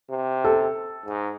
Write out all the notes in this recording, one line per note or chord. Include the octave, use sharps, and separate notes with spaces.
C3
A4
G#2